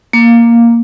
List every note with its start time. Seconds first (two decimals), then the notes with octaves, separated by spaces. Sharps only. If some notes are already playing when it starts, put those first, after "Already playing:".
0.13 A#3